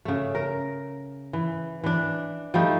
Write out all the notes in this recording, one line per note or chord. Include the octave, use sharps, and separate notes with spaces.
C#3 A3
A#4
E3
E3 D4
F3 G3 A3 D#4